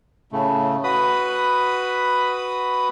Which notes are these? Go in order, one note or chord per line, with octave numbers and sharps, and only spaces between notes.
A2 C#3 A3
F#4 B4 B5 D#6